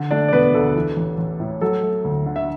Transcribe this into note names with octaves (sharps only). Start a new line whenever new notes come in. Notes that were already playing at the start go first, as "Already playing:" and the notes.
Already playing: D3
A3 D4 D5
D5
E1 B3 B4
D2 A4
E3
A1
A1
A2
F#3 A4
A3
D2
D3
E5